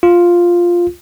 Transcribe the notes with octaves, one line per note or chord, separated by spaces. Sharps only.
F4